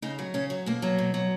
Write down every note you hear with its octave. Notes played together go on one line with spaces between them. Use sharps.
C#3 D#4
F#3
C#3 C#4
F#3
B2 A#3
F#3
B2
F#3